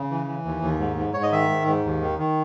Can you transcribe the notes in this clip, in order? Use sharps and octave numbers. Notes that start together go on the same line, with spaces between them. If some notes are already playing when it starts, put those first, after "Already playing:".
Already playing: C#3
E3
E3
D#2
D#2
G#2
G#2
G#2 C#5
D#5
D#3 E5
G#2
G#2
D#2
D#3
D#3